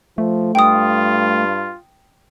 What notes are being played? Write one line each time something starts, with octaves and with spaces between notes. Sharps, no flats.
F3 A3
G2 F4 G5 D#6